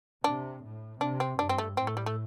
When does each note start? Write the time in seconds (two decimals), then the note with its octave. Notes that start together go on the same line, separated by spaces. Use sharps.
0.24 C3 D4
0.63 A2
1.01 C3 D4
1.20 C4
1.39 G2 D4
1.49 C4
1.58 A3
1.77 A2 C4
1.87 A3
1.97 G3
2.06 A3